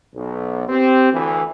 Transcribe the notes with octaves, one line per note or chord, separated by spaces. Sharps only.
B1
C4 G4
D2 E3